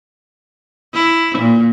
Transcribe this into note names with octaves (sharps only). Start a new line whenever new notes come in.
E4
A#2